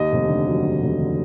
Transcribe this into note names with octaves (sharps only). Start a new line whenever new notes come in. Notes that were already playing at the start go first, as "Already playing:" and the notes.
Already playing: D#2 D#5
F1
D3
F#3
D#2
F1
D3